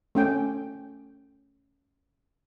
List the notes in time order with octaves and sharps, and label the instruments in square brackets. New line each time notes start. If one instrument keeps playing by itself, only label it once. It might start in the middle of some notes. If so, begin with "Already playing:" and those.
[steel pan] A3 C#4 G5